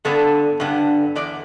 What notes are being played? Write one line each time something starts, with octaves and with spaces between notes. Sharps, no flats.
G2 D3 B3 A4
G2 D3 B3
E2 D3 B3 D5